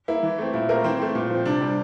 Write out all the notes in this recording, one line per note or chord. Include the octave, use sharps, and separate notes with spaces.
A#3 E4
E3
A3 C4
A#2 E4
A3 A#3 C4 A#4
E3 C4 C5
A3 C4
A#2
F3 C4
C3 D4 D5
G3 C4